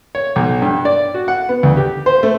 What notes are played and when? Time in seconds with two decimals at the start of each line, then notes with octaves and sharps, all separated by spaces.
0.15 C#5
0.36 B1
0.62 G2
0.85 D5
1.14 F#4
1.28 F#5
1.49 B3
1.63 D2
1.77 G4
2.06 C5
2.23 A3